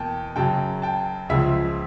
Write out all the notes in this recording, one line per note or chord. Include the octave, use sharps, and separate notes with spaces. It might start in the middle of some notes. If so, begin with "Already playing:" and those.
Already playing: E2 B2 A#3 G5 A5
F#2 C#3 F#3 G5 A5
G5 A5
C#2 C#3 F3 E5